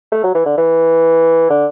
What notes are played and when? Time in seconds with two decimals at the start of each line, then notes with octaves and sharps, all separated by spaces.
0.12 A3
0.23 F#3
0.35 E3
0.46 D3
0.57 E3
1.49 D3